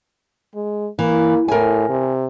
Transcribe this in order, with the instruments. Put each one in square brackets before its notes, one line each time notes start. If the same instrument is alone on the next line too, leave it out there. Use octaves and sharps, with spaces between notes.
[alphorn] G#3
[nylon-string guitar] E3 [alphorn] A#3
[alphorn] A2 [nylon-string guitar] A#4 G#5
[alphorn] C3